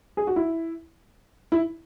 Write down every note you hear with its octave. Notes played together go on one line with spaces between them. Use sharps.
G#4
F#4
E4
E4